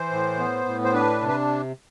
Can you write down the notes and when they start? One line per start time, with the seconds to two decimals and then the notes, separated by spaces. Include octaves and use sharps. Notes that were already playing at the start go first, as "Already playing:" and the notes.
Already playing: E3 C5
0.11 A2
0.39 B3
0.66 A2
0.84 C5
0.93 D4 B4
1.21 C3
1.29 B4